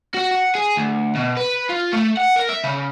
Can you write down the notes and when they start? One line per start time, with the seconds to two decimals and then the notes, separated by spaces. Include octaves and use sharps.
0.14 F#4
0.31 F#5
0.55 G#4
0.76 D2
1.15 B2
1.37 B4
1.69 F4
1.93 A3
2.17 F#5
2.36 A#4
2.49 E5
2.64 C#3